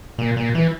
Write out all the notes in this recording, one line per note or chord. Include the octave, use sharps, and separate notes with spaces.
A#2
A#2
E3